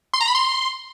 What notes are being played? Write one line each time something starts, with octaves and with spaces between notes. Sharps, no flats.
C6
A#5
B5
C6